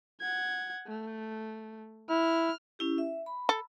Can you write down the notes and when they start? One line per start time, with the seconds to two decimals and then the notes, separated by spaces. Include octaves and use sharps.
0.21 F#5 G#6
0.87 A3
2.10 E4 F6
2.79 C#4 E4 G4
2.98 E5
3.26 B5
3.49 A4